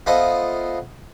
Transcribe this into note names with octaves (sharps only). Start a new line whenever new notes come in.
B3 F4 A4 C5 D#5 E5